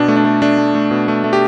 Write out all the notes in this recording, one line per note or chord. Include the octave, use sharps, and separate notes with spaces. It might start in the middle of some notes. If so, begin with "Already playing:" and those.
Already playing: B2 D4
A3
D4
A3
A3 D4
A3
A3
B2
A3
A3
G4